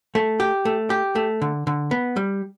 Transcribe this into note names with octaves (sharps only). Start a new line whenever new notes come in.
A3
G4
A3
G4
A3
D3
D3
B3
G3